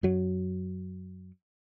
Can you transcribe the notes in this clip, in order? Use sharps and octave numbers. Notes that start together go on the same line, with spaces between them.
F#2 F#3